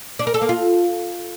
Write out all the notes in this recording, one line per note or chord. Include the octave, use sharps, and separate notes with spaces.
D4
A#4
A4
A#3
F4